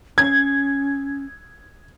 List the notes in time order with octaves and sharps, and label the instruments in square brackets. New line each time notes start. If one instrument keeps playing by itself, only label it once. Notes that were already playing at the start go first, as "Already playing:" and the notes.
[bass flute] C#4 [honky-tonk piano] G#6